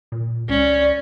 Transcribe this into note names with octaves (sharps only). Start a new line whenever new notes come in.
A#2
C#2 C#4 D5